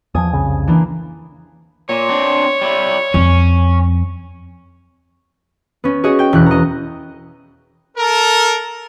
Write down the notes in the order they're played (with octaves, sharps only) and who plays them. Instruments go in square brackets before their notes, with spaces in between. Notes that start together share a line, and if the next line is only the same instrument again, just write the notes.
[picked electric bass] E2 F3 [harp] G#5 D#6 G#6
[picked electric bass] C2 F2 C#3
[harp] E3 A#3 D4
[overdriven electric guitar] A#2 [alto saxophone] C#5
[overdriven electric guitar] C4 D4
G3 E4
[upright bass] F2 [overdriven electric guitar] C#4
[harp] B3 C#4
F#4 G#4 C#5 D#5
G5
E1 E3 F#6
D#5 A#5
[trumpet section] A4 A#4